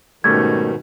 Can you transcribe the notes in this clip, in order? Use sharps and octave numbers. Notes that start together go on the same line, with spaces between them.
G#2 B2 D#3 G3 A3 C#4 G#6